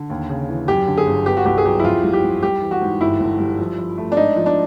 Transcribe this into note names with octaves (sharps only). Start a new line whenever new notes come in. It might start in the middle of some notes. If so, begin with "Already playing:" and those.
Already playing: D3
D#2
C#3
E3
F#2 G4
D3
G#4
G1
B3 G4
F#4
C2 G4
G#4
F#3 G4
E4
F2 F4
G3
G4
G3
G3 G4
E3
F#4
G#2
G1 E4
G1
G3
F3
F3
A3
D4
G#2 D#4
F3
D4